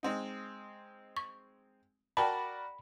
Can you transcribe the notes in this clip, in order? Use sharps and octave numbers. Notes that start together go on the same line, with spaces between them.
G#3 C4 D#4
C#6
F#4 A#4 D5 G5 A5 B5